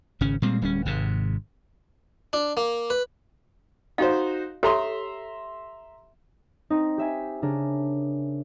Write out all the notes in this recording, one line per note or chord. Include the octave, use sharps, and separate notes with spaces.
G#1 C#3 C#4
A#2 G3 G#3 C4
D1 G3 B3 C#4
G#1 G#2 C3
D4
A#3
B4
D#4 F#4 C5 D#5 F5
G4 A4 C#5 E5 A#5 C6
C4 D#4
G4 E5 G#5
C#3 D4 A#4 G#5